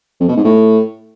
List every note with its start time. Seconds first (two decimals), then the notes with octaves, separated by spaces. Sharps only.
0.21 F2
0.29 B2
0.36 G#2
0.44 A2